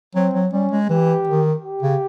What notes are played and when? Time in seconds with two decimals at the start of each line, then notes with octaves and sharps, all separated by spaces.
0.15 F#3 C4
0.34 F#3
0.52 G3 C#4
0.72 G#3
0.89 E3 G4
1.27 D#3
1.64 G4
1.83 C#3